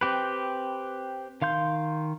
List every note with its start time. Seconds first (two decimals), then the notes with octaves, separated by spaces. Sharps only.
0.01 C4 G4 B4
1.42 D#3 F5 C6 G6